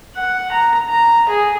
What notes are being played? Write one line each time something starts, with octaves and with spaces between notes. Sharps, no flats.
F#5
A#5
A#5
G#4